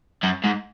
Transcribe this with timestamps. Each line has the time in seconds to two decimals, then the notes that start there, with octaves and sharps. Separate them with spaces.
0.23 F#2
0.44 G#2